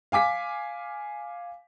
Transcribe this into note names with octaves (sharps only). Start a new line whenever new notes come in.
F5 G#5 D6 B6